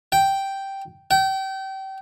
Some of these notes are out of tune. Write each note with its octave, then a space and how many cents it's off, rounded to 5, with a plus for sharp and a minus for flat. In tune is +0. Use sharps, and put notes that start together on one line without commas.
G5 -5
G5 -30